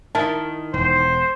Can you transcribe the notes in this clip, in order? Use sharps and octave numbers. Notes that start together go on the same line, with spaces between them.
D#3 E4 A5
E1 C5